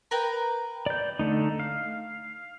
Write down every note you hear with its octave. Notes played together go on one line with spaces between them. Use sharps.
A#4 B4 G5
D5 G6
D3 A3 D#4
F5